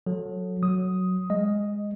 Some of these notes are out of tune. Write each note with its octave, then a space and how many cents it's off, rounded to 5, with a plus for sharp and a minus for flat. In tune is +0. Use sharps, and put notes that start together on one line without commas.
F#3 -20 A4 +0
F#3 +0 D#6 +5
G#3 -10 D#5 +0